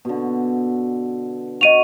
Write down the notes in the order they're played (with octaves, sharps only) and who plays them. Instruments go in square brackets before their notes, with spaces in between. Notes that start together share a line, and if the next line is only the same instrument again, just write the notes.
[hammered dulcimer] B2 D3
[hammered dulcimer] F#4 [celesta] D#5 D#7 F7